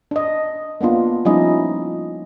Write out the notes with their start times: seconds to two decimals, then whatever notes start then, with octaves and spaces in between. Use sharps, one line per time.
0.11 D4 D#5
0.81 A#3 B3 D4 F4
1.25 F3 G3 C#4 D#4 E4 D#5